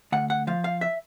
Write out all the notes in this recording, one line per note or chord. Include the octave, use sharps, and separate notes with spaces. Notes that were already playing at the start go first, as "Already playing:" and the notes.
D2 F#5
F#5
F3 F5
F5
E5